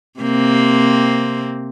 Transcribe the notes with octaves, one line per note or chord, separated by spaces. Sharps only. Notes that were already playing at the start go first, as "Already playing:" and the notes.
C3 A#3 C4